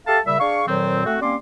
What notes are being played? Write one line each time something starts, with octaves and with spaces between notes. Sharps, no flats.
G4 A4 E5 F5 A5
A#2 C#3 G3 E5
D4 G#4 F5 C#6
F2 A#2 D#3 F#3 C4
A3 C4 F#4
G3 A#3 C4 C#4 C6 D6